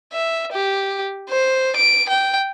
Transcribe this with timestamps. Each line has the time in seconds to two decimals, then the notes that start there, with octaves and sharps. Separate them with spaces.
0.12 E5
0.53 G4
1.29 C5
1.76 D7
2.09 G5